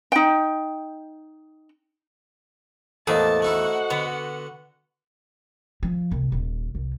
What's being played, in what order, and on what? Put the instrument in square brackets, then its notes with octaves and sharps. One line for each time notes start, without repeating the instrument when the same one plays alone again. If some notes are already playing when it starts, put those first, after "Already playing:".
[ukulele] D#4 G5
[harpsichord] A1 A#3 D6 [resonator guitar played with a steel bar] E2 [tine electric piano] A4 C5 D#5 [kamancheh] A5
[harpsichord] A3 D#4 E4 [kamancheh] F#4 F#5
[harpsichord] D3 [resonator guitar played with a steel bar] B3
[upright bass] F3
C2
D#1
C2